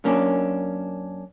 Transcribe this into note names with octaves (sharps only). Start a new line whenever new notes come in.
F#2 A#3 C#4 D4